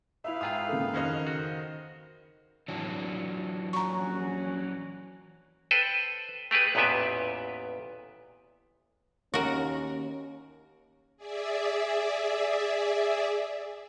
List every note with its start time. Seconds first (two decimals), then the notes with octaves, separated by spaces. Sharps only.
0.24 D#4 E4 B4 E5 F5
0.41 G#2 F4 G#4 G5 D#6
0.69 C#3 A#3 A4
0.94 F2 D#3 C#4 F#4 C5 D#5
1.27 F#4
2.68 E3 F#3 D4
3.73 A#1 C#4 F#4 A#5 C#6
5.71 A4 B4 C5 G5
6.51 A3 G4 G#4 B4
6.75 A1 E2 A#2 B3 G4 E5
9.34 D#2 C#4 F#4 A#4
11.17 G#4 D5 E5